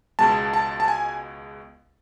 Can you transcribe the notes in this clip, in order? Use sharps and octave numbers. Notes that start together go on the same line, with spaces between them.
C#2 B2 G#3 A5
A5
A5
G#5